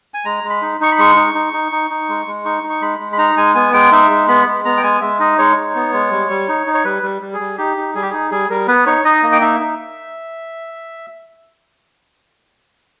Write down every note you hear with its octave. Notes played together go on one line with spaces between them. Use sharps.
G#5
G#3 A#5
G#3
B5
D#4
D#4 C#6
B5
G#3 C#6
D#4
D#4
D#4
D#4
D#4
G#3
G#3
D#4 C#6
D#4
C#6
G#3 B5
G#3
B5
D#4 A#5
G#3 G#5
B3 G#5
G#3 G5
D#4 E5
G#3
B3 B5
G#3
B3 A#5
G5
G#3 G#5
G#3 E5
D#4 D#5
G#3 C#5
D#4
B3
G#3
G3
G3
D#4
D#4
C#5
G3 B4
G3
G3
G#4
G3
D#4 G4
D#4
G3 G#4
G4
D#4 G#4
G3 G#4
G3 A#4
B3 B4
D#4 C#5
D#4 D#5
A#3
G5
D#4 E5
D#4